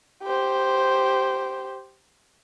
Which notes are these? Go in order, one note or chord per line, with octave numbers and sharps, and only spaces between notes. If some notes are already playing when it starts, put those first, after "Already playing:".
G4 C5